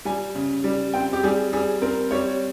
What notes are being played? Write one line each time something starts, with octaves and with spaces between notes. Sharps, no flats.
G3 G#5
C#3
G3
C4 G5
G4
G3 G#4
G3 G#4
C4 A#4
G3 C#5